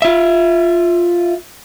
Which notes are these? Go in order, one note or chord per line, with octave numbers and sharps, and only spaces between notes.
F4 E5